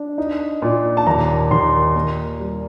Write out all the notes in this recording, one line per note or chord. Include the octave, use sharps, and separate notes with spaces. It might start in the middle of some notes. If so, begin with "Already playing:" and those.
Already playing: D4
D#4
A#2
A5
D#2 A#5
D#2 C6
A#3
G3